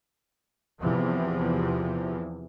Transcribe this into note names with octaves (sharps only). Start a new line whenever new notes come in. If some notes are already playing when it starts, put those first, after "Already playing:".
E2 C3 E3 F3